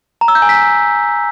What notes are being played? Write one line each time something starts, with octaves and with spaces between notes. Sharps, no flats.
A#5
E6
G6
G#5
B6